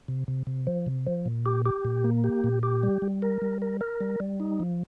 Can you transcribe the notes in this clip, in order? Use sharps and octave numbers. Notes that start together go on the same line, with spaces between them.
C3
C3
C3
F3
C3
F3
A#2
G4
G4
A#2
A#3
G4
A#2
G4
G3
G3
A#4
G3
A#4
A#4
G3
G3
D#4
F3